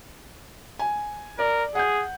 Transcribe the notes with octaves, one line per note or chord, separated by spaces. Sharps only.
G#5
A#4 D5
G#4 F#5 G6